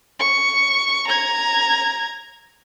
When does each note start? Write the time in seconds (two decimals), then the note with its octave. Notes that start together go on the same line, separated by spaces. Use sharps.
0.20 C#6
1.07 A#5 G#6